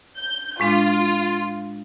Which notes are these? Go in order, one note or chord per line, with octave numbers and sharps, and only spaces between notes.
G6
A2 G#3 D4 F4